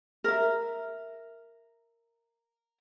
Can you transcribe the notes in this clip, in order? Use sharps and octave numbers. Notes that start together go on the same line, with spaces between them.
A#4 E5